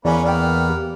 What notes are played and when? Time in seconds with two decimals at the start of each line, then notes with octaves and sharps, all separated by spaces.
0.05 E2 A#3 C#4 B4 D5 G#5
0.25 A#3 B3 D5 G5 F6
0.70 G4